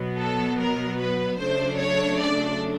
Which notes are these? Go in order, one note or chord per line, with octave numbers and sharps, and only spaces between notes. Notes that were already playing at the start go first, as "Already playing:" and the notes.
Already playing: B2 F#3 B3
A4
A#4
B4
C#3 F#3 A3 D4 C5
C#5
D5